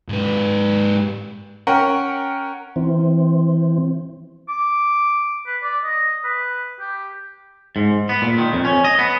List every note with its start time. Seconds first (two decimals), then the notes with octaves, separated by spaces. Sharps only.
0.09 G#2 B4
1.67 C#4 A#4 F#5 G5
2.76 E3 C4
4.49 D6
5.47 B4
5.63 D5
5.84 D#5
6.25 B4
6.80 G4
7.76 G#2
8.09 B3
8.22 A#2
8.38 D#3
8.53 F2
8.65 C#4
8.85 D#5
8.99 B3